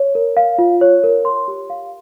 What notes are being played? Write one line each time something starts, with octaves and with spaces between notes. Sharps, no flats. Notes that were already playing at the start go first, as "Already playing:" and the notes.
Already playing: C#5
A#4
F5
F4
C#5
A#4
C6
G4
F5